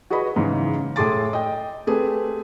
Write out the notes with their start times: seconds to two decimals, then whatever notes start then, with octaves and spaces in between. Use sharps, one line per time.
0.10 F#4 G#4 B4 D#5 B5
0.36 G#2 C#3 E3
0.96 A2 G#4 A4 C6 D6 A6
1.33 D#5 G5
1.87 A3 C4 G4 G#4 B4